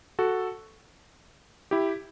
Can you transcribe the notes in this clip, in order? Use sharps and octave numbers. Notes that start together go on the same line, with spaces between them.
F#4 A4
E4 G4